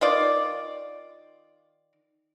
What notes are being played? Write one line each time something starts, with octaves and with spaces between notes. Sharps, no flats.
D#3 F4 D5